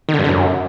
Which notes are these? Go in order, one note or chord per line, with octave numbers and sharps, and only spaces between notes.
D#3
D3
G2
D3
F#2